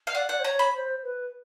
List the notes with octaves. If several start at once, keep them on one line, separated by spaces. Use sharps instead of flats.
F5
D5 F#5
D5 F#5
C5
C#5 A#5
B5
C5
B4